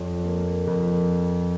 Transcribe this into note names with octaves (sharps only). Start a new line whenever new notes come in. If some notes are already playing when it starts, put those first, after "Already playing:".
Already playing: F2 C#5
A#3
F2 A#4